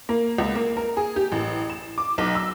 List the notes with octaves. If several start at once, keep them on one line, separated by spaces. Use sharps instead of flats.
A#3
C#2
A#3
A#4
G#4
G4
A1
E7
D6
B1
E6